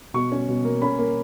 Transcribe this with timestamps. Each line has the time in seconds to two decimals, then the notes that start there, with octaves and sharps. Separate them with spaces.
0.14 B2 C#6
0.32 C#4
0.49 B2
0.65 A#3
0.82 C#4 B5
0.98 A#3